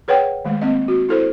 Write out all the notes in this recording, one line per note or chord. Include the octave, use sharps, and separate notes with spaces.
G#4 B4 C#5 F#5 G5
D#3 G#3 A3
A#3 C4 D#5
F#4
E4 A4 C5